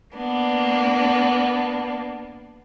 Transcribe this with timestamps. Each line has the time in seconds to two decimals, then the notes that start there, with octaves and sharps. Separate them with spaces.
0.15 A#3 B3 D4